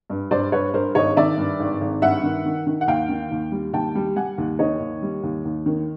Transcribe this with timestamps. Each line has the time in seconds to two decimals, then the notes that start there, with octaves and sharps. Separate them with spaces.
0.10 G2
0.31 G2 C5 D5
0.52 G2 B4 C#5
0.74 G2 A#4 C5
0.95 G#1 C#5 D#5
1.17 D#3 D5 E5
1.37 G2
1.60 G#1
1.81 G#1
2.02 G2 E5 F#5
2.23 D#3
2.45 D#3
2.66 D#3
2.81 F#5
2.87 D#2 F5 G5
3.09 D#3
3.31 D#2
3.52 G3
3.73 D#2 G5 A5
3.95 G3
4.16 G3 F#5 G#5
4.38 D#2
4.59 D#3 C#5 D#5
4.80 D#2
5.02 G3
5.23 D#2
5.45 D#2
5.66 D#3